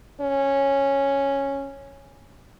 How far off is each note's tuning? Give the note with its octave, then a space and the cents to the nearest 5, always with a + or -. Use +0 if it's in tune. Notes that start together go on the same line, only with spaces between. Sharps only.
C#4 -5